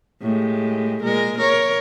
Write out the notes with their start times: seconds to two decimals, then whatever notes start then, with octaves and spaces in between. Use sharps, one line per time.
0.22 A2 G#3 G4
1.02 A#2 G#3 A#4
1.38 A#4 C#5